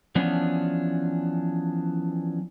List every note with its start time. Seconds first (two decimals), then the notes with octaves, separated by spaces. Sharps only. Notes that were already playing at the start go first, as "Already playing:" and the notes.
0.15 E3 F3 B3 C#4 D4